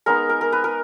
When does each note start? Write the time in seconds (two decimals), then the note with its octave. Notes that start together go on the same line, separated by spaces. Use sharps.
0.06 G#3 B3 D#4 A#4
0.29 A#4
0.41 A#4
0.52 B4
0.64 A#4